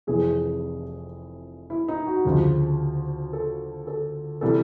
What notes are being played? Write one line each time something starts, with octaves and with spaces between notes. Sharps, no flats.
F1 F2 C3 E3 G#4
E4
D#4
F#4
D2 C#3 F3
A4
A4
C3 E3 G3 A4